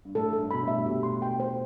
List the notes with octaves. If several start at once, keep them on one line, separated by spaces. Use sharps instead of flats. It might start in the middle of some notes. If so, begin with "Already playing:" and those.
G2
A2 A4
A4
G2
B2 B5
A2
E5
B2 G4
C6
G5
C5